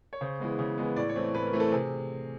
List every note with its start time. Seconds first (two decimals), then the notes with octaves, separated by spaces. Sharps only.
0.13 C#5
0.21 C#3 C5
0.40 E3 G#3 B3
0.59 C#3
0.78 E3 G#3 B3
0.96 A2 D5
1.09 C#5
1.16 E3 A3 C4
1.35 A2 B4
1.47 A#4
1.53 E3 A3 C4
1.60 A4
1.72 C3 G#4